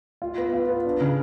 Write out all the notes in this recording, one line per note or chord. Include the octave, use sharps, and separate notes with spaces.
F4
B3
F4
B3
D4
C#3